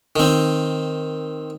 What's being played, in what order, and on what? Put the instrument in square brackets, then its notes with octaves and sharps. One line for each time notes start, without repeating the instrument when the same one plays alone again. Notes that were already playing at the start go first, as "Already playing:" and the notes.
[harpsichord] D#3 C4